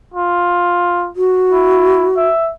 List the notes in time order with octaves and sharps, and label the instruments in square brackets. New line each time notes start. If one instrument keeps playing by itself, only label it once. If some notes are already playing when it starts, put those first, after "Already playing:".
[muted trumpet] F4
[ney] F#4
[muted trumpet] E4
E5